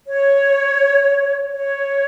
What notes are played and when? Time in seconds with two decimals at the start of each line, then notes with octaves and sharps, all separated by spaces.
0.06 C#5
1.51 C#5